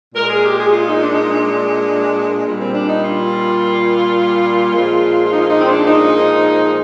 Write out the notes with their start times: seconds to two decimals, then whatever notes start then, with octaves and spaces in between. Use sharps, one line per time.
0.14 A#2 G#3 A#4
0.29 G#4
0.43 G4
0.58 G#4
0.71 F4
0.86 D#4
1.00 D4
1.14 D#4
1.28 D4
2.43 A#2 G3
2.56 C4
2.71 D4
2.85 D#4
3.01 F4
4.71 A#2 F3 G#3
5.24 F4
5.29 D#4
5.39 F4
5.48 D#4
5.60 C4
5.66 D4
5.85 D#4